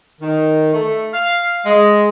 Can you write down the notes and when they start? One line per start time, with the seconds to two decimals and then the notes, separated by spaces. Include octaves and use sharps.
0.21 D#3
0.73 A3
1.14 F5
1.65 G#3